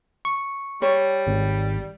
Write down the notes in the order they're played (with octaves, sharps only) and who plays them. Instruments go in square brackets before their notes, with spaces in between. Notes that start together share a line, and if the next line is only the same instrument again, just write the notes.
[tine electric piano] C#6
[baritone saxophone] G3 [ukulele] C#5
[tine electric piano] G#1